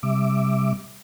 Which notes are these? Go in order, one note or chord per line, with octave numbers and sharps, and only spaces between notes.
C3 G3 E5 D6